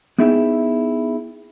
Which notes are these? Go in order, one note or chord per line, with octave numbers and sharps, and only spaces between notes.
B3 D#4 E4 G#4 E5 G5